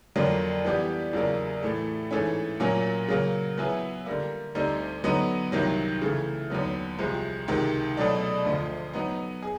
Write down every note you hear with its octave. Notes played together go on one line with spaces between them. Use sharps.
F2 D3 F#3 A#3 D4
E3 G3 B3 D4 G4
E2 C#3 F#3 A#3 D4
A2 E3 A3
G#2 E3 A3 C#4
A#2 F#3 A#3 C#4
C#3 F#3 A#3
F#3 B3 E4 G#4 B4
D3 G3 A#3
D2 D3 G3 C4 D#4
D3 F#3 B3 D#4
C2 C3 D#3 F#3
C#3 E3 A3
D#2 D3 F#3 B3
C2 C3 F3 G#3
C#2 C3 D#3
B2 F#3 A3 D4
D2 D3 F3
F#3 B3 D#4
G#4